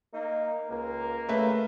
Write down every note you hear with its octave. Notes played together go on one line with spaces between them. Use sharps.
A#3 D#4
C#2 A#3
C#3 A3 B4 E5